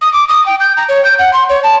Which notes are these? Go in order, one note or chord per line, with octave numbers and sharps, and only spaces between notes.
D#6
D6
D#6
G5
G6
A#5
C#5
G6
F#5
C6
C#5
A5